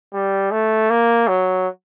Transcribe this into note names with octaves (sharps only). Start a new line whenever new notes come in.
G3
A3
A#3
F#3